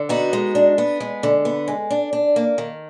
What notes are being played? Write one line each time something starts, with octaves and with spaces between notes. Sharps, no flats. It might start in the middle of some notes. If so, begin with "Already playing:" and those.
Already playing: D3
B3 D#4 F#4
G#3
D4
B3
G#3
D3
B3
G#3
D4
D4
A#3
D#3